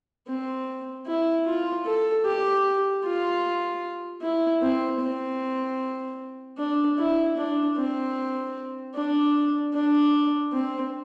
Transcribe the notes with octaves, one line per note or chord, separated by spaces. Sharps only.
C4
E4
F4
A4
G4
F4
E4
C4
C4
D4
E4
D4
C4
D4
D4
C4